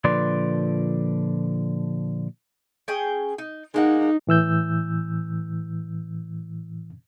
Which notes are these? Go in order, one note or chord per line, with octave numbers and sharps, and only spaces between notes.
A#2 D3 F3 B4 D5 C6
C#4 G#4 G5
D#4
G#3 A#3 D#4 F#5
A2 E3 E6 G6